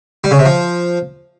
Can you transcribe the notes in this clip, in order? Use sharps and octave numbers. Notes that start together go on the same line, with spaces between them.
G3
C#3
C3
F3